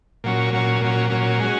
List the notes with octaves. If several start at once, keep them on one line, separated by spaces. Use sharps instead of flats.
A#2 F#3 C#4
A#2 F#3 C#4
A#2 F#3 C#4
A#2 F#3 C#4
G#3 C#4 F#4